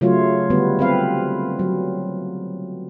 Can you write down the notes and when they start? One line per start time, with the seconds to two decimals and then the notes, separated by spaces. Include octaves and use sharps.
0.01 C#3 F#3 A3 F4 C#5
0.50 D3 G3 B3
0.79 C4 B4 F5
1.59 F#3